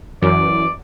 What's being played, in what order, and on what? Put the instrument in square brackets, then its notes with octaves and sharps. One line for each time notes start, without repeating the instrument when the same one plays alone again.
[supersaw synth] F#2 [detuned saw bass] E3 [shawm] D5